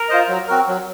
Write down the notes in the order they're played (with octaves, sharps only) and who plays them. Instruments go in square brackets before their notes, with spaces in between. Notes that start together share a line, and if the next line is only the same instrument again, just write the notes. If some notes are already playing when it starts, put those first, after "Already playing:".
Already playing: [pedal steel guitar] A#4
[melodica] F4 C5 D#5
F#3
C4 F#4 A#4
F#3